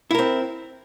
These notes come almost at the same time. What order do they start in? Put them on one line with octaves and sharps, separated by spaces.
E4 A#4 C4